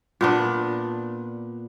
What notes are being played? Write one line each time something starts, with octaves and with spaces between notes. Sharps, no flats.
A#2 B3 D4